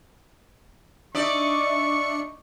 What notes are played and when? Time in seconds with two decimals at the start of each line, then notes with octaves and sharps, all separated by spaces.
1.15 D4 D#4 D5 E5 C#6 D6 C#7